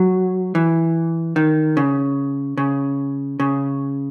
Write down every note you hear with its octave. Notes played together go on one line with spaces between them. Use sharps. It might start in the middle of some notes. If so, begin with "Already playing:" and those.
Already playing: F#3
E3
D#3
C#3
C#3
C#3